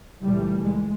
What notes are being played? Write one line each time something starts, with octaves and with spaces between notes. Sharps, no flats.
C#2 A#2 E3 G3 A3
G#3